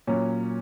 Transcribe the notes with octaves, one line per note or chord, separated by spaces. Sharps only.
A#2 F#3 C#4